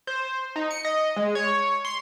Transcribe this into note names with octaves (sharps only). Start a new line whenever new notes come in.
C5
D#4
C#7
D#5
G#3
C#5
C6